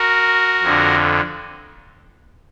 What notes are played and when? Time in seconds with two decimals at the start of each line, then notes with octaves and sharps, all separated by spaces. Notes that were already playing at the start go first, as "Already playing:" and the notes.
Already playing: F#4 A#4
0.63 F2 D3